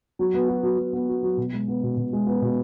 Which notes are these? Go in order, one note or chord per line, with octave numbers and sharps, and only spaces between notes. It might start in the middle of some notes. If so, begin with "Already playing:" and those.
F#3
B3
F#4
F#3
F#3
B3
F#4
F#3
B2
G#3
B3
B2
B2
G#3
B3
B2